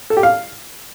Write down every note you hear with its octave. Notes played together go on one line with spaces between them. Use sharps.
A4
G4
F5